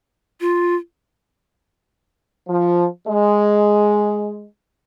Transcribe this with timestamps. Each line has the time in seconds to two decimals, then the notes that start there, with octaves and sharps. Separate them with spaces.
0.41 F4
2.48 F3
3.07 G#3